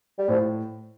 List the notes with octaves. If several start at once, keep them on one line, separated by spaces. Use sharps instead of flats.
G3
A2 F3